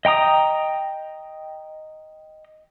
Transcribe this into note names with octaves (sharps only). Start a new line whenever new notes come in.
D#5 G5 A#5 D#6